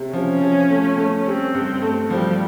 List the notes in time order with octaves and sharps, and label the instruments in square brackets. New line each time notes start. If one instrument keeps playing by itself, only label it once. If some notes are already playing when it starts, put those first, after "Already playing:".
Already playing: [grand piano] C3
[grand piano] F3 [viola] C#4
[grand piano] F3
A3
A3
[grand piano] G3 [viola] C4
[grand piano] G2
A3
[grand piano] F3 [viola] G3